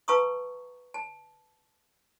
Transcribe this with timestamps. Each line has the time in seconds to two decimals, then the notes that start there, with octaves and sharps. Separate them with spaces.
0.08 B4 F5 A5 A#5 C#6 D#6
0.94 A5